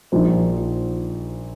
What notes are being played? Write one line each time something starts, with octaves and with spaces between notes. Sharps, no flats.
A#1 A#2 F3 D#4 C5